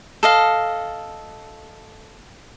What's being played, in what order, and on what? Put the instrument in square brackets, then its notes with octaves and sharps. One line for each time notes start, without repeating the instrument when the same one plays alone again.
[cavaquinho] A4 D#5 F5